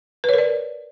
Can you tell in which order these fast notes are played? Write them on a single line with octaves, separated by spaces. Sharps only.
B4 C#5 A#4 D5